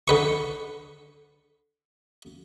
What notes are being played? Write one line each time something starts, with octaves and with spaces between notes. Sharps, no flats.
D3 B4 C#6